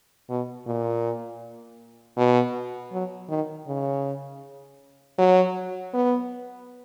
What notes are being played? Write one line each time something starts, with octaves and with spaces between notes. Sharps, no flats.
B2
A#2
B2
F#3
D#3
C#3
F#3
B3